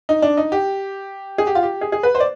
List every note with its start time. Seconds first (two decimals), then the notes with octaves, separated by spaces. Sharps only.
0.09 D#4
0.22 D4
0.37 D#4
0.52 G4
1.38 G#4
1.47 G4
1.55 F4
1.63 G4
1.81 G#4
1.92 G#4
2.03 B4
2.15 C5
2.20 D5